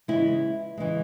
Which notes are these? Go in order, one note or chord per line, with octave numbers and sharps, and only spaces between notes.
C#3 E3 G#3 E4
C#3 E3 G#3